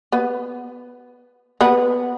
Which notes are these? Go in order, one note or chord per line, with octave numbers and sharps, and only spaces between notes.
B3 B4
B3 B4